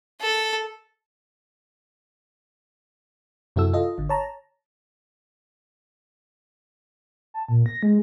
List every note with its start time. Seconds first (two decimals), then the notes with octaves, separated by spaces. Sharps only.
0.21 A4
3.56 F#2 C3 E4 F#4 A4 E6
3.73 F4 A4 D#5
3.98 G#1 D3
4.09 C#5 A5 A#5
7.34 A5
7.48 A#2
7.66 A#6
7.83 G#3